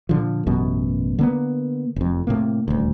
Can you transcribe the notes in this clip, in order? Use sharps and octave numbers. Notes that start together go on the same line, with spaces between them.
A#2 D3 F3
A1 F#2 B2
D3 A#3 B3
F1 F2
A2 C3 A#3
D#1 D2